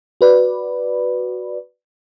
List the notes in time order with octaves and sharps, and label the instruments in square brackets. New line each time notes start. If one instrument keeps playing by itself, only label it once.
[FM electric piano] F#4 B4 D5